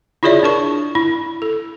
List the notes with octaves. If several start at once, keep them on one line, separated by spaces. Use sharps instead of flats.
E4 F4 G#4 C#5 D5 E5
D4 A#4 A5 C#6
E4
A4